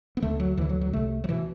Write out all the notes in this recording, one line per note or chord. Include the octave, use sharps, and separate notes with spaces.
B3
D2 D3 A3
F#3
D2 D3 E3
F#3
F#3
C2 C3 A3
F#3
B2 E3